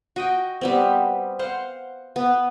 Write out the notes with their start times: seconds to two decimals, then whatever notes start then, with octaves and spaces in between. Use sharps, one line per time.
0.16 F#4 D#5 G5
0.61 G3 B3 C4
1.39 C5 F5 F#5
2.16 B3